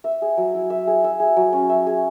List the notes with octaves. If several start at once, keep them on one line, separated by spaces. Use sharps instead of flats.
E5
G#4
F#3
E4
E5
G#4
E5
G#4
F#3
C#4
E5
G#4